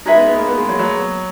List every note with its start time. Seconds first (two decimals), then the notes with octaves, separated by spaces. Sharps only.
0.05 G#3 D#4 G#4 B4 E5
0.15 B3
0.27 B3
0.37 A#3
0.47 B3
0.58 G#3
0.69 F#3
0.79 F#3